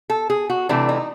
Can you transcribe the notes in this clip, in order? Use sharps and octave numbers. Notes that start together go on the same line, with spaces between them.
A4
G#4
F#4
C3 E3 A3 D4
D#4